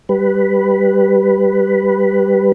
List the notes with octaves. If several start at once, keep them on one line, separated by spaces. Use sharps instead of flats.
G3 B4